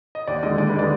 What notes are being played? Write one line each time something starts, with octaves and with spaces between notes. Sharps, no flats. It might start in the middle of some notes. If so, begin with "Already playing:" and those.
D#5
D#2 D5
D3 G#3 D#5
D#2 D5
B4
D3 G#3 D5